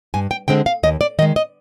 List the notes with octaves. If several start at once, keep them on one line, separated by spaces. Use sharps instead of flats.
G2 G#5
G5
D3 G#3 C4 G5
F5
D#2 D#5
D5
D#3 G#3 D#5
D#5